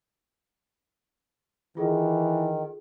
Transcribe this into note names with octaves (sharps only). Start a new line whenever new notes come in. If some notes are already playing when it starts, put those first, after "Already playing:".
D#3 E3 F4 G#4 A4